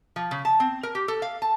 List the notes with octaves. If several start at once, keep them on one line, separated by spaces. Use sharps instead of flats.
F3
C#3
A5
C4
A#4
G4
A4
F5
A5